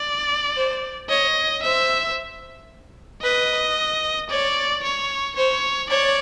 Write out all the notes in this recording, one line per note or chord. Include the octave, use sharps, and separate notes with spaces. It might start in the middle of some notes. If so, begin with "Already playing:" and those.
Already playing: D5
C5
C#5 D#5
C5 E5
B4 D#5
C#5 D5
C#5
C5 C#5
C#5 D5